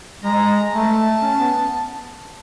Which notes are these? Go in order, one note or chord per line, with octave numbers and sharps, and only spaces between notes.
G#3 A#5
A3 A5
C#4
B3